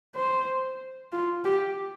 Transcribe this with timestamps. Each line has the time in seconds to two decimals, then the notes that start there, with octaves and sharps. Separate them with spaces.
0.15 C5
1.12 F4
1.44 G4